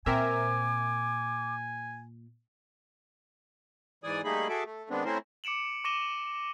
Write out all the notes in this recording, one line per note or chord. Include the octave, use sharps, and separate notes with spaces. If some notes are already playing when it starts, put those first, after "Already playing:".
A#2 C4 A#4 E5 G#5 D6
G#2 E3 D5 G#5 D#6
G3 A3 A#3 D#4 G#4 B5
F#4 G#4 A4 E5 D6
A3
D#3 G#3 B3 C4 D4
A3 C4 C#4 E4 A#4 C5
D6 C#7 D7 E7 F#7
C#6 D6 A#6 D#7 E7 G7